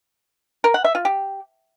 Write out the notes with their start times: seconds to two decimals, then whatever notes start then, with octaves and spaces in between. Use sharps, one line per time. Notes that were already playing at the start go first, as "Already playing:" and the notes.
0.64 A#4
0.74 F#5
0.84 E5
0.95 F4
1.05 G4